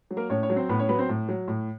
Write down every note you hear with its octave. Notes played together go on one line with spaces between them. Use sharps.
F#3
A#3 A#4
A2 C#4 C#5
C#4 C#5
F#3
C4 C5
A2 B3 B4
C#4 C#5
F#3 B3 B4
C4 C5
A2
F#3
A2